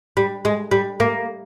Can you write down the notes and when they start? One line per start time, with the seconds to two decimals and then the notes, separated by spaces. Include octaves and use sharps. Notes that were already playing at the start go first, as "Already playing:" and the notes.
0.17 G3
0.45 G#3
0.71 G3
1.00 A#3